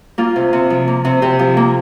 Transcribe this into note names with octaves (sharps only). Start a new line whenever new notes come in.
A#3 F4
C3
C3
F3
A#3
C3
C3 G4
F3
A#3